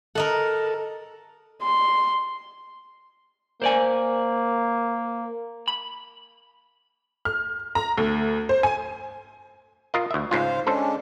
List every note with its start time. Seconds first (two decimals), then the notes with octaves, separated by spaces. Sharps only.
0.15 A4 A#4 D#5 F#5
1.63 C6
3.62 A#3 C5 D5 G#5
5.68 B5
7.25 F6
7.75 A#5
7.98 D2
8.49 C5
8.63 G#5
9.94 F4 A#4 D#5
10.11 D2 E5
10.31 C#2 G#2 F4 C5 F5
10.67 G#3 C#4 D4 A4 C5